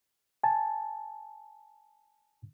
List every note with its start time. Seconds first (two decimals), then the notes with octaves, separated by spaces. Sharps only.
0.44 G#5 A5